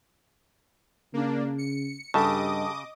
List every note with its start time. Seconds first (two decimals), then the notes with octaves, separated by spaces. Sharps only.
1.14 C#3 A#3 D4
1.58 C#7
2.14 G2 C#3 G4 A4 D#5 A5 D6 D#6